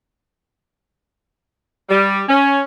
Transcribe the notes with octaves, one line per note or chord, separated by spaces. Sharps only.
G3
C#4